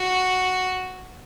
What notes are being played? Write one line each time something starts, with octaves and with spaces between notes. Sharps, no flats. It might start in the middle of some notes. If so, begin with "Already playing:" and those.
Already playing: F#4